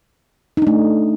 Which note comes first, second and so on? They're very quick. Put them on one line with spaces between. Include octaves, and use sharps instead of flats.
D#4 D4 A3